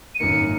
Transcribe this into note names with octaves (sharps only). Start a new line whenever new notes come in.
D#7
G#1 F#2 D#3 A#3 C#7